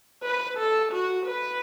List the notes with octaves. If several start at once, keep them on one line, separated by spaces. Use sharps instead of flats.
B4
A4
F#4
B4